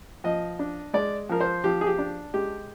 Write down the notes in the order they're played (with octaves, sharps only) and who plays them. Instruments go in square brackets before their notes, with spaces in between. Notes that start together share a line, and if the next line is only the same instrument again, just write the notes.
[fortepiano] F3 D#5
D4
G#3 D5
F3 A#4
C5
F3 G4
G#4
G4
D4
G#3 G4